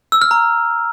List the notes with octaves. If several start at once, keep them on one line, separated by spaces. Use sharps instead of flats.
E6
F6
A#5